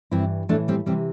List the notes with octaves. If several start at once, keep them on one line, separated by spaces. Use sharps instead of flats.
G2 E3 C4 E4
A2 E3 A3 D4
G3 C4
C3 E3 G3 C4